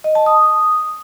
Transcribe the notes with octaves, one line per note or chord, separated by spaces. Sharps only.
D#5
A5
D#6